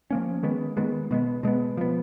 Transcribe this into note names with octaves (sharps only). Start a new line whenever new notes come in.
F3 A#3 C#4
D#3 G#3 B3
D#3 G#3 B3
B2 G#3 B3
B2 G#3 B3
F3 B3